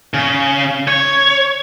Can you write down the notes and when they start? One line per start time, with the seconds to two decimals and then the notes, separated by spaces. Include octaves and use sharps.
0.14 C#3
0.88 C#5